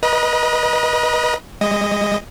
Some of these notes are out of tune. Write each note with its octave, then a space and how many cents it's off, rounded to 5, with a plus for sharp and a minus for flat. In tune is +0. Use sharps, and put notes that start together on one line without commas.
B4 -30 D#5 +0 A#5 +40
G#3 -35 D#5 +0